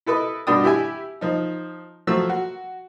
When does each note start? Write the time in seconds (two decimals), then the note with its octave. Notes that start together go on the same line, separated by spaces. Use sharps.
0.06 E4 A4 B4 D#5
0.47 G2 B2 D4 G5 D#6
0.64 E4 G4 E5 G#5
1.21 F3 D#4
2.07 F3 F#3 A3 E6
2.29 F#4